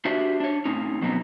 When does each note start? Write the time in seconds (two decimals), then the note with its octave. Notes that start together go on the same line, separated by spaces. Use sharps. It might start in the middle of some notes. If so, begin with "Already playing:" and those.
0.05 D4 F#4 G4 C5 D5 E5
0.40 D4 C#5
0.65 A2 C4 C#4 D#4
1.01 F2 B2 F#3 B3 C4 D#4